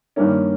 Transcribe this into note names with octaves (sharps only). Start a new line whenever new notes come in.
G2 D#3 G3 A#3 C#4